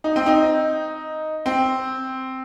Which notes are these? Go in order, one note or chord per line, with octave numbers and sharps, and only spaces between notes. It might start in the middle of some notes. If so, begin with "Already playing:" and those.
D#4
C4
D#4
C4